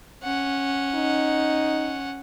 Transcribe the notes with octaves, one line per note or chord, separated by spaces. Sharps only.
C#4 F#5
D#4